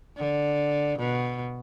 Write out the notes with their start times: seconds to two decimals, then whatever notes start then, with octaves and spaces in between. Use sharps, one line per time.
0.17 D3
0.98 B2